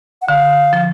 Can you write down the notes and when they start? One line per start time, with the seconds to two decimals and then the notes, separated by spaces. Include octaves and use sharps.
0.22 F#5
0.28 D3 F5
0.73 F3